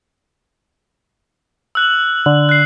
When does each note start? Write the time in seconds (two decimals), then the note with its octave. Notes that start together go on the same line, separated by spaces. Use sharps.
1.75 E6 F#6 F#7
2.26 D3
2.49 F#6 C7